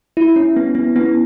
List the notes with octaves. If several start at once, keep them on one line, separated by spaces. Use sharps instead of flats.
E4
C#4
B3
B3
B3